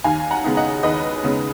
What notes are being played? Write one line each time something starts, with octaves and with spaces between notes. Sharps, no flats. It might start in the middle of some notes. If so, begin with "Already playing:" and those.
D#2 F5 G#5
F#5 A#5
C#3 G#3 B3 D#4
D#5 F#5
D#2 B4 D#5
C#3 G#3 B3 D#4